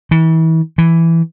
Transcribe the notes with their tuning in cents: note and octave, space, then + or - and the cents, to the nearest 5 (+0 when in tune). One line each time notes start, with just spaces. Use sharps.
E3 -35
E3 +5